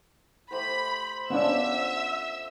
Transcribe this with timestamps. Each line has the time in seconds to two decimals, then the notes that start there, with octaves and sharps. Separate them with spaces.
0.51 A3 G4 C5 B5
1.30 F3 B3 C#4 D4 E5 F#5 E6